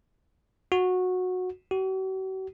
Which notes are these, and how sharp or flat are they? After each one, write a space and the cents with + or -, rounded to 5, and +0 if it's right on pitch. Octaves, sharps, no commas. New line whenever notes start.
F#4 -15
F#4 +45